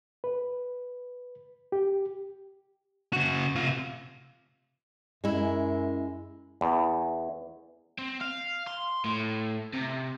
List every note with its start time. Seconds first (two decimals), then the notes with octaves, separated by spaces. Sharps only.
0.24 B4
1.72 G4
3.13 C#3 F#4
3.55 C3 F4
5.24 F#2 G#3 E4
6.61 E2
7.99 C4
8.21 F5
8.67 C6
9.04 A2
9.74 C3